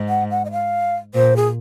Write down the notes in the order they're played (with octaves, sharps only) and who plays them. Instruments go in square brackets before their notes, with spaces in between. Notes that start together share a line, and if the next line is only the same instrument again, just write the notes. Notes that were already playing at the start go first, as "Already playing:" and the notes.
Already playing: [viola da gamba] G#2
[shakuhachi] F#5
F#5
D#5
F5
[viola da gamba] A#2 [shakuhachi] C5
[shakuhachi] G#4